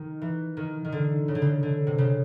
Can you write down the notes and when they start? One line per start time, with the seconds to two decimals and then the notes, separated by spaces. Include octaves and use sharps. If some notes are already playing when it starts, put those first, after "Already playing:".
Already playing: D#3
0.22 E3
0.57 D#3
0.85 D#3
0.92 D3
1.28 C#3
1.35 D3
1.42 C#3
1.63 D3
1.87 C3
1.98 C#3